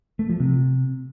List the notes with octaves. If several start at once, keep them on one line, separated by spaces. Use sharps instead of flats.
A3
F3
C3